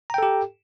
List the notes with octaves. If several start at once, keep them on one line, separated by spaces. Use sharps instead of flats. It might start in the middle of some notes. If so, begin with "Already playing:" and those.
G4 A4 G5 A#5